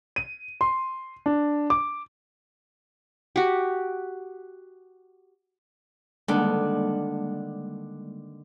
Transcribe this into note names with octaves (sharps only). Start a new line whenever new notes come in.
D#7
C6
D4
D6
F#4 G4
D3 D#3 G3 G#3 A#3 D4